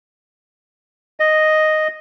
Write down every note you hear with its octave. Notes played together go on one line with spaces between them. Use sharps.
D#5